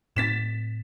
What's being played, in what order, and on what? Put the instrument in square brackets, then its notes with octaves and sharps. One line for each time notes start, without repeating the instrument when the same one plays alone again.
[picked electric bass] A2 C4 [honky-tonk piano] A6 B6 E7